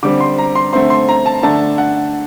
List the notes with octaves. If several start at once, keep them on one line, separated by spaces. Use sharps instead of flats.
D3 G3 C4 D6
C6
A#5
C6
D3 A3 C4 C6
C6
A#5
A5
D3 A3 D4 A5
F#5